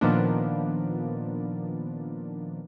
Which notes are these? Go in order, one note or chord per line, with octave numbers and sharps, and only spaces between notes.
A#2 D#3 F3 A#3 B3 D4